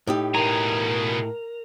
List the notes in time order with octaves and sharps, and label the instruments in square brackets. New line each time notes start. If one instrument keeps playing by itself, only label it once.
[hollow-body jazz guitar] A2 D#4 G4
[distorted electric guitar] B2 G#4 [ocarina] A#4 [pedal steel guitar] A#5